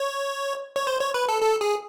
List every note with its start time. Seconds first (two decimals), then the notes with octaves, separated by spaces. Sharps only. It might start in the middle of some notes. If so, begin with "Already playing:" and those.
Already playing: C#5
0.76 C#5
0.87 C5
1.00 C#5
1.14 B4
1.29 A4
1.42 A4
1.61 G#4